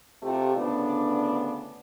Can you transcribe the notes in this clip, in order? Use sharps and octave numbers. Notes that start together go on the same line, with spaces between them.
C3 A3 F4 G4
D2 A2 C#3 B3 D4 D5